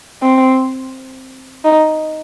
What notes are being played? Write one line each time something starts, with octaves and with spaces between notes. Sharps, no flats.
C4
D#4